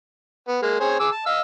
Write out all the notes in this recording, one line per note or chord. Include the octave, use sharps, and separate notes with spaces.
B3
G#3 A#3
C4 G#4 C#5
G#4 D6 E6
A5
D#5 F5 E6